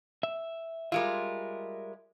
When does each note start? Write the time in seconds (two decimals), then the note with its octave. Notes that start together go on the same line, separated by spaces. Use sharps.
0.23 E5
0.92 G3 G#3 F4 A#4 E5